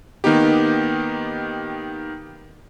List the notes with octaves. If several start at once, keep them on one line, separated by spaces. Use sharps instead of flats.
D#3 A#3 B3 D#4 G4